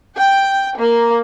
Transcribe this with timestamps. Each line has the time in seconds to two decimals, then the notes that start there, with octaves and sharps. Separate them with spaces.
0.18 G5
0.77 A#3